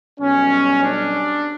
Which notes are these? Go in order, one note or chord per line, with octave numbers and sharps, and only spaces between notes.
B1 B2 G3 C#4
D4